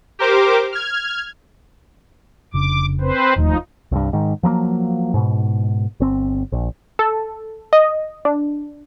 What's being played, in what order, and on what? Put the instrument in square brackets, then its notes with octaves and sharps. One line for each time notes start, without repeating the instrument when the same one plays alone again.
[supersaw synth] G4 A#4 C5 D6
F6 G#6
[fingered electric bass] F1 C#3 D4 [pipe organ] D6
[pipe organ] C4 B4 C5
[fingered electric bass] E1 D#2 A3 [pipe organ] F3 D#4
[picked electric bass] C2 G2
G#2 D#3
F3 F#3 G#3 A#3
G#2 B2
G1 C4
A#1
[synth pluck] A4
D#5
D4